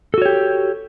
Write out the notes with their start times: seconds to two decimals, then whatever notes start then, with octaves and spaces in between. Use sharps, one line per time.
0.14 A4
0.18 F#4
0.22 C#5
0.26 G4